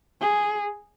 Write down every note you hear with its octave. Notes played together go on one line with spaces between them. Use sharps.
G#4